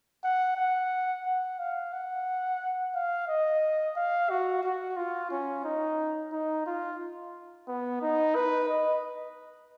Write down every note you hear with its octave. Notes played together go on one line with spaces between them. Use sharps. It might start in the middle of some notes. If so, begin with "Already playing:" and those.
F#5
F#5
F#5
F5
F#5
F5
D#5
F5
F#4
F#4
F4
C#4
D#4
D#4
F4
B3
D#4
B4
D#5